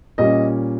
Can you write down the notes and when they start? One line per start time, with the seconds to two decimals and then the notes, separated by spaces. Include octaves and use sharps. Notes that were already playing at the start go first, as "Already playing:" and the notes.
0.18 A#2 G3 C#4 D#5